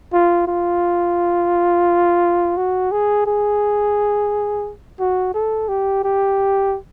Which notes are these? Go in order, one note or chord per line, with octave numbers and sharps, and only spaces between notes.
F4
F4
F#4
G#4
G#4
F#4
A4
G4
G4